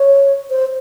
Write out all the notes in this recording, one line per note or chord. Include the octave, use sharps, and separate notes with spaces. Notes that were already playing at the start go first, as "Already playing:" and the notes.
Already playing: C#5
C5